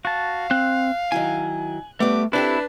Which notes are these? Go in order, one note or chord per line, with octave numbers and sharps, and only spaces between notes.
F#4 F5 A5
C4 F#6
D#3 F#3 E4 G#5
G3 A3 B3 D6
C4 D4 E4 G4 A4 B4